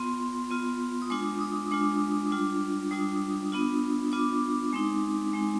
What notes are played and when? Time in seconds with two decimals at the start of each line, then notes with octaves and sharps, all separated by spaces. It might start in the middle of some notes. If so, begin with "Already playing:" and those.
Already playing: B3 F4 C6
0.51 B3 F4
1.02 D#6
1.10 G#3 D4 F4 D6
1.40 D#6
1.71 G#3 D4 F4 D6
2.31 G3 D4 F4
2.91 G3 D4 F4 D#6
3.52 B3 D4 F4
4.12 B3 D4 F4 D6
4.73 G#3 C4 D#4
5.33 G#3 C4 D#4